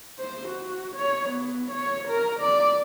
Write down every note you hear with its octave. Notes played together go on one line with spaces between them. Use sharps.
C5
F#4
C#5
B3
C#5
A#4
D5